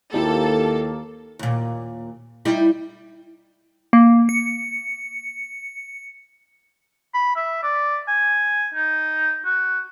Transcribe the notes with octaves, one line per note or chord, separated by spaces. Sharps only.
D#2 A#3 E4 F4 G4 A4
D#2 A#2
G3 D#4 E4
A#3
C#7
B5
E5
D5
G#5
D#4
F#4